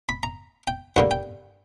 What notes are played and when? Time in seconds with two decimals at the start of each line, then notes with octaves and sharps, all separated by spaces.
0.09 B5
0.23 A#5
0.67 G5
0.96 G2 D3 G3 A#3 F#5
1.11 G5